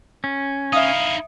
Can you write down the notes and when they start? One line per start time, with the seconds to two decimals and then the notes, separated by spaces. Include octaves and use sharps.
0.24 C#4
0.73 D#4 E4 E5 F5 D#6